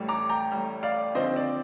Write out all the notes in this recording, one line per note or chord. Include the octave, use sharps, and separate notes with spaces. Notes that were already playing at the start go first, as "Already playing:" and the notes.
Already playing: A1 A2 G3
A#5 D6
G5 A#5
A1 A2 G3
D5 F5
D#2 D3 F3 C4 C5 D#5
D5